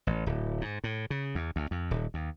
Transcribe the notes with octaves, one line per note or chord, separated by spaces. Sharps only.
A1
D1
G#2
A2
C#3
E2
D2
F2
D#1
D#2